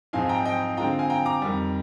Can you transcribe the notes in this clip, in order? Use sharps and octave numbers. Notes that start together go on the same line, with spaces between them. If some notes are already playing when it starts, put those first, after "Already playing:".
G#2 F3 C4 D#4 F5 G#5
G5 A#5
D#5 G5
D3 G#3 C4 F4 G5 A#5
F5 G#5
G5 A#5
A#5 D6
F2 D#3 G3